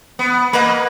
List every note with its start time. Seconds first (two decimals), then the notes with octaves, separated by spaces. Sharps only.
0.19 B3
0.53 A#3 B4 D#5 F#5